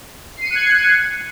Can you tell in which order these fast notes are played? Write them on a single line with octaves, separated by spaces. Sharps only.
C7 D#7 C#7 F#6 G#6